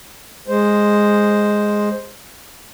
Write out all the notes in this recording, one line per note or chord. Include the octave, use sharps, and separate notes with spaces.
G#3 C5